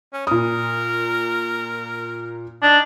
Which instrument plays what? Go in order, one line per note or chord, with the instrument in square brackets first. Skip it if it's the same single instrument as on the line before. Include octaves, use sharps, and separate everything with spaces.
[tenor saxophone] C#4
[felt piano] A#2 D#6 [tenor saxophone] A#4
[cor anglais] D4 [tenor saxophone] D#4